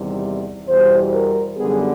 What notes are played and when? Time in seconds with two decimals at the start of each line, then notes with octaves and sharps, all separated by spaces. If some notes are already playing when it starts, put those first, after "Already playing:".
Already playing: E2 C3 D#3 G3
0.67 E2 B2 G3 C5
1.12 A#4
1.56 F#2 D3 G3 B3 G#4